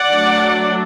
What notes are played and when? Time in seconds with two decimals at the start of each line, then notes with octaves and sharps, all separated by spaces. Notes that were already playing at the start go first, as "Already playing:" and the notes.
Already playing: D5 F#5
0.12 F#3 A3 D4